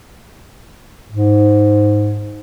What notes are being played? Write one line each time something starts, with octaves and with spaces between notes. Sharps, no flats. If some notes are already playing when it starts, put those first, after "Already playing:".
G#2